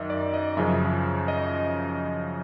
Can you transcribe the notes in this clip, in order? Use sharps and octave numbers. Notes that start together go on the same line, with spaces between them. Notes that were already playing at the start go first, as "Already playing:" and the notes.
Already playing: F#2 D#3 D#5 E5
D5
D#5
F#2 C#3 F3 E5
D#5